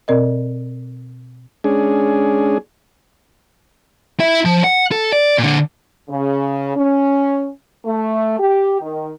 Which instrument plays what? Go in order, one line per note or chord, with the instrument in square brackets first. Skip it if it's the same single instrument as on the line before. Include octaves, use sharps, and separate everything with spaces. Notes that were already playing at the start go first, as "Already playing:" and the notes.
[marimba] B2 C4 A#4 D5 D#5
[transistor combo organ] G#3 C#4 D4 G#4
[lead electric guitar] E4 E5
F3
F#5
A4
D5
A#2 D3
[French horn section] C#3
C#4
A3
G4
D#3